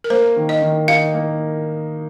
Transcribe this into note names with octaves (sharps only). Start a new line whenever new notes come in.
A#4
A#3 C5
D#3
D#5
D#3
D#4 F5
A#3